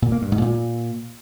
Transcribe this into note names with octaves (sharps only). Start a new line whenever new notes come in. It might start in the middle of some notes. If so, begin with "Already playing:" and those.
A#2
A#3
G2
G#2
A#2